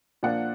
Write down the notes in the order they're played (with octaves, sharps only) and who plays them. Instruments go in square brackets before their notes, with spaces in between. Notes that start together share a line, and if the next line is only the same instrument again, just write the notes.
[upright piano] A#2 F3 A#3 D4 F#5